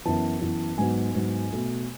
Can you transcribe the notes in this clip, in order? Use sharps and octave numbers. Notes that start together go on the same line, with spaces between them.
F#2 E3 B3 A5
F#2 E3 B3
G#2 F#3 B3 G#5
G#2 F#3 B3
B2 A3